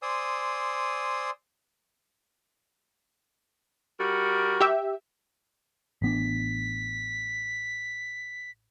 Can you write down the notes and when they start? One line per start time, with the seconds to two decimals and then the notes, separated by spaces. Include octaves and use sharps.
0.02 C5 D5 G#5 C6 D#6 E6
3.99 G3 F#4 A#4
4.61 G4 E5
6.02 A1 B3 D4 B6